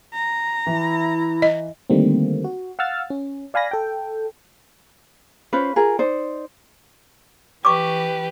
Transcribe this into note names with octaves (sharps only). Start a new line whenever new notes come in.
A#5
E3 E4
D#5
D3 D#3 G3 A3 A#3 C4
F#4
F5 F#5 E6 F6 A6
C#4
D5 F5 G#5 B5 A#6
A4 G5
C#4 F4 B4 C5
F4 G#4 A#4
D#4 C5 D5
E3 G4 B4 C#6 D6